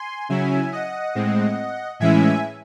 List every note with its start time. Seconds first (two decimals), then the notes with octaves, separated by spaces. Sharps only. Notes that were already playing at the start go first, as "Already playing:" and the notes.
Already playing: G#5 C6
0.29 C#3 F#3 C#4 E4 E5 G#5
0.72 D#5 F#5
1.15 A2 G#3 C4
2.00 A2 E3 G#3 C#4 E4 E5 G#5